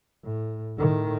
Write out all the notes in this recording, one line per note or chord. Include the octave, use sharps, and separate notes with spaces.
A2
A2 D#3